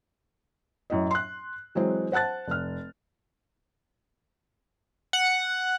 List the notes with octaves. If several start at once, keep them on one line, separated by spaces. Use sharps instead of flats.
F#2 A2 D#5
C6 F#6
E3 F#3 G#3 C4
C5 F#5 A5 F#6 A6
F1 F6
F#5